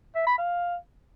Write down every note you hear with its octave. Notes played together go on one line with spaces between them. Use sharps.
E5
B5
F5